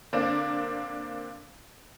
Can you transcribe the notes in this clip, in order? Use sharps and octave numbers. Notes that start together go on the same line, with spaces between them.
D3 A#3 C4 D4